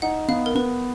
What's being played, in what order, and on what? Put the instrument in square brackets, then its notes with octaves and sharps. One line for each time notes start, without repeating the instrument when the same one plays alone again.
[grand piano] D#4 [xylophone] F#5
[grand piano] B3 [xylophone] F5
[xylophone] A#4
[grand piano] B3 [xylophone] B4